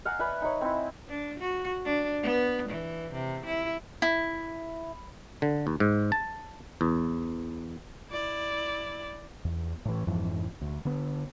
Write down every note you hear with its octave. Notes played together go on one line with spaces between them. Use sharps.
F5 F#5 G#5 A#5
B4 D5 E5 G#5
D#4 C#5
C4 E4
D4
F#4
D4
B3
E3
C3
E4
E4
D3
D#2
G#2
A5
E2
E4 D5
E2
A2 E3
F2 G#2 E3 F3
D2
D3 B3